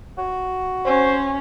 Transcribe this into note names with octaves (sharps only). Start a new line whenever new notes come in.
F#4
C#4 C5